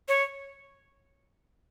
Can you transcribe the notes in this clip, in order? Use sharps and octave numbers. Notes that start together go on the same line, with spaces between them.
C#5